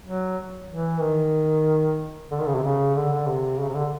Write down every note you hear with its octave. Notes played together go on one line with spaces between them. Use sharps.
F#3
E3
D#3
D3
D#3
C#3
C3
C#3
D3
D3
C3
C#3
C3
D3